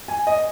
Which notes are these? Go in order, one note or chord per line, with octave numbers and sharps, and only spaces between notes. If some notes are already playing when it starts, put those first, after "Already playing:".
G#5
D#5